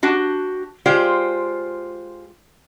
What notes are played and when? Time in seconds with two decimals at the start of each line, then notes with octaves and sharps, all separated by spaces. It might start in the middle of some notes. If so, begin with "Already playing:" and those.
0.03 D4 F#4 G4
0.86 G#3 F4 G4 C5 D5